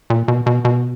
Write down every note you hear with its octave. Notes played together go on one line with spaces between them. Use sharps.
A#2
B2
B2
B2